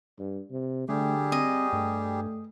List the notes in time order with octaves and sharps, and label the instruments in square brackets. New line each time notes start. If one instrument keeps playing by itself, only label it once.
[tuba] G2
C3
[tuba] D3 [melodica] G3 G4 G#4 [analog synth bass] A3
[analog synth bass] C4 [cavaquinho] D#5
[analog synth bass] G2 [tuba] A3